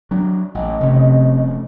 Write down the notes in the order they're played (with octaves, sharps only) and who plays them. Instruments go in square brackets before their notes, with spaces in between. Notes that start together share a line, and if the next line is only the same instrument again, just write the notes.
[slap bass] F#3 D4
[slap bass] A1 [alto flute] D#5
[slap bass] F1 A3 C#4 [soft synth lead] C3